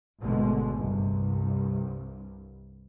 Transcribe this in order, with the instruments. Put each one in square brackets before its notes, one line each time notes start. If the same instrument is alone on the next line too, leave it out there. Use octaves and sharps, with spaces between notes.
[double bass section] G#1 B2 D3 G#3 A3
C2 G2